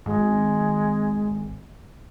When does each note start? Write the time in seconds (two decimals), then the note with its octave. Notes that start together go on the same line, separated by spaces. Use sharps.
0.06 G#1 G#3